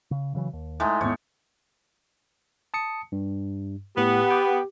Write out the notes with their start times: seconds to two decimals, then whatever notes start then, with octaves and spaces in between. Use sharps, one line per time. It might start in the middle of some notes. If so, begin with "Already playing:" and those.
0.11 C#3
0.35 C#3 E3 F#3
0.53 D#2
0.80 A2 G#3 D#4
1.01 D#2 G#2 B3 C#5
2.74 A5 D#6 C#7
3.12 G2
3.97 A2 B3 G4
4.30 G5 D6